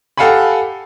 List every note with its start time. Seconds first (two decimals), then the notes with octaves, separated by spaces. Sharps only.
0.17 G4 A4 F5 F#5 G#5 B5